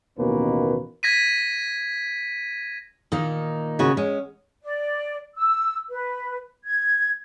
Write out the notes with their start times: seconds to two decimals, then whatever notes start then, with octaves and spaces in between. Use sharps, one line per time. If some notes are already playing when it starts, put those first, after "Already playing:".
0.18 A1 D#2 B2 A#3 C#4 B4
1.03 G#6 A#6 B6 D#7
3.12 A#2 D#3 D#4
3.79 C#3 F#4
3.97 G#3 C#4
4.64 D5
5.37 E6
5.90 B4
6.65 G#6